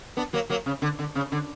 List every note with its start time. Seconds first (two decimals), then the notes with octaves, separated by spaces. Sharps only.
0.17 B3 D4
0.33 F#3 A#3
0.49 F#3 A#3
0.66 C#3
0.82 D3
0.99 D3
1.15 C#3
1.32 D3